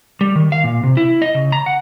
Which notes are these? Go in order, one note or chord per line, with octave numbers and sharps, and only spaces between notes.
G3
D#3
F5
A#2
C3
E4
D#5
C#3
A#5
F#5